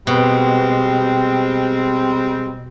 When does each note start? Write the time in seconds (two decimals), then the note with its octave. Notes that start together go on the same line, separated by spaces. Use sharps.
0.07 B2 G3 G#3 C4